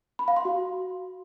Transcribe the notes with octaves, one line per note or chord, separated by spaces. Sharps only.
B5
F5
C6
F#4